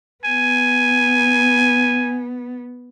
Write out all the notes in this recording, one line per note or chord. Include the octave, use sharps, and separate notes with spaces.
B3 G#5